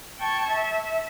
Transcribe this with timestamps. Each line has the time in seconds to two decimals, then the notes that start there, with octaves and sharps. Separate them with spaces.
0.18 G5 A5 C#6 G#6
0.50 E5